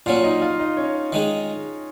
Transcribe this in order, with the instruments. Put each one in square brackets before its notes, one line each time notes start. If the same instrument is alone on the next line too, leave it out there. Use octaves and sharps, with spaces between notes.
[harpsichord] A#2 F#3 C#4 [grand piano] F4 F5
[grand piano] D#4 D#5
F4 F5
D#4 D#5
C#4 C#5
[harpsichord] D#3 G#3 D#4